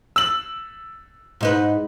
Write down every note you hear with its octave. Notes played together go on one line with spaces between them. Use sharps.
E6 F#7
G#2 D#4 B4